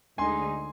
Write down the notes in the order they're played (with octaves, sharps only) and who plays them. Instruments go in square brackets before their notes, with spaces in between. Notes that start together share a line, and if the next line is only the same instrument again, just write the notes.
[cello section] D2 D3 G#3 D#4 G#4 [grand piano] G#5 C6